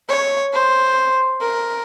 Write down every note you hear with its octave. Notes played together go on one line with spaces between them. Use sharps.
C#5
C5
A#4